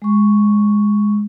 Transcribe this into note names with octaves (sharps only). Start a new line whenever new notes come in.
G#3 C#6